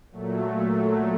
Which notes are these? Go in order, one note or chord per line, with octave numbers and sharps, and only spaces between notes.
A#2 F#3 A3